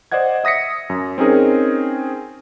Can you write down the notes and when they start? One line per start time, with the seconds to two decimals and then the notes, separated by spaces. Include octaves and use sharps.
0.12 C5 D5 D#5 F#5 G#6
0.44 E5 D#6 A#6 B6 C#7
0.90 F#2
1.18 C4 C#4 D#4 G#4 A#4